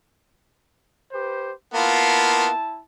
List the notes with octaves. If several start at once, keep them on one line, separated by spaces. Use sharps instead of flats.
G4 B4 C5
A#3 B3 E4 F4 A5